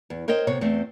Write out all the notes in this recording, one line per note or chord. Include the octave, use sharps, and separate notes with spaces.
E2
A#4 C5 C#5 D#5 G5
C3 B3 C#5
E2 A3 C4